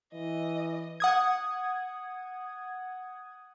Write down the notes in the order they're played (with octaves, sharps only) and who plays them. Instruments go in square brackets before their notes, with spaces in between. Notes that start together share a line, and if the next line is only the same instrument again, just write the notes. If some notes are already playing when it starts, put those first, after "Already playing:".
[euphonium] E3 [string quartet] D#5
[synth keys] F#5 D#6 G#6